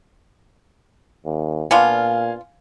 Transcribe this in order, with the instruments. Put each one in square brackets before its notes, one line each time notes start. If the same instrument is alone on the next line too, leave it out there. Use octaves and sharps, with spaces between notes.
[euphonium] D#2
[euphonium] A#2 [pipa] B3 D4 F4 [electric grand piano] F5 G#5